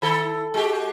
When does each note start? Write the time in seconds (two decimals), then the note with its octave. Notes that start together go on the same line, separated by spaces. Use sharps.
0.02 D#3 E4 A4
0.54 G#3 F#4 G4